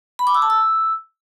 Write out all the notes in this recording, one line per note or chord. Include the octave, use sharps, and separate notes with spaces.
B5
D6
E6
A5
E6